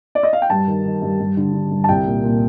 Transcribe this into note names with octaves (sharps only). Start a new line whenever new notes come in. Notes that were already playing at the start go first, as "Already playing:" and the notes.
D5
D#5
F5
G5
G2 A5
D#3
D#3
G2
G2
D3
D3
G2
A5
C2 G5
A#2
A#2